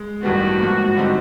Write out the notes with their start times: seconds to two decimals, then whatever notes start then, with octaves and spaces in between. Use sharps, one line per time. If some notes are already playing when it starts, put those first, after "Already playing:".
Already playing: G#3
0.23 A1 G2 D#3 G3 B3 F#4
0.60 G#2 F3 A#3
0.96 D3 G3 C4 D#4